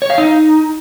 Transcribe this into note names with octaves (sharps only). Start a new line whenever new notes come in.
C#5
F5
D#4